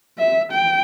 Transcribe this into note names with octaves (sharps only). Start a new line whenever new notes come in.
E5
G5